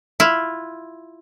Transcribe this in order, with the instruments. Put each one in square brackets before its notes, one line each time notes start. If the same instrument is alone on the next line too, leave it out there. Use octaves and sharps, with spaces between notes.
[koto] E4 F4